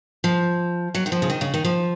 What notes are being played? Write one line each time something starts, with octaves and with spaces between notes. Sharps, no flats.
F3
F#3
D#3
F3
C#3
D#3
C#3
D#3
F3